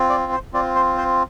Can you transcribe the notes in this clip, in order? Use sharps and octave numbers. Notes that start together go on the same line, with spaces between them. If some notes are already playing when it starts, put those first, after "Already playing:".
Already playing: C4 F4
D5
C5
C4 F4 D5
C5
C5